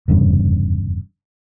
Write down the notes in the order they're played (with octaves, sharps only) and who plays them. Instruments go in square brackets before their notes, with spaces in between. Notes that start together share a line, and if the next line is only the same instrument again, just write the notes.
[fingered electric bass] F1 E2 G2 C#3